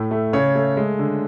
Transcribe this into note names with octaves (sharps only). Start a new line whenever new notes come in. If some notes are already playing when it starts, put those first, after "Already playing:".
Already playing: A2 A3
A3
C#3 C#5
A3
G#3
D3